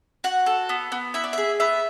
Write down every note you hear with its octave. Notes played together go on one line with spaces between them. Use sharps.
F#4 F#5
A4
B3
B3
E4 E5
D5
G#4 E5
B3 E5